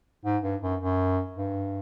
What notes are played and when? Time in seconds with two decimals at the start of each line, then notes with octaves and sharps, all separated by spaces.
0.25 G#2
0.43 G2
0.62 F#2
0.81 F#2
1.37 G2